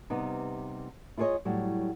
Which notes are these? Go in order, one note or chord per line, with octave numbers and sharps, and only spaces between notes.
C3 G3 B3 D#4
E4 F4 G#4 A4 C#5 D#5
A2 F#3 G3